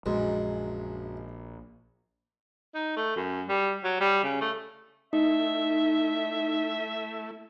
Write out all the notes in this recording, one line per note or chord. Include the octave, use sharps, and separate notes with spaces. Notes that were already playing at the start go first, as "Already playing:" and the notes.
A#1 F#2 G#3
D#4
A3
F#2
G3
F#3
G3
C#3
A3
A3 D#4 E4 E5